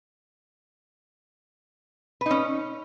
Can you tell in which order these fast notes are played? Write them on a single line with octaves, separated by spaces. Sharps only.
B4 D#4 C#4